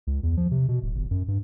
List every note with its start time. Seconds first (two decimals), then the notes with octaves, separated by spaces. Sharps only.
0.07 C#2
0.23 E2
0.37 F3
0.51 C3
0.68 B2
0.82 D1
0.95 G1
1.11 F#2
1.28 G2